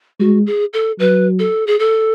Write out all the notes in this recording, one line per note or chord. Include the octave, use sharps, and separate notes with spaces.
G#3 F#4
G#4
A4
F#3 B4
A4
G#4
A4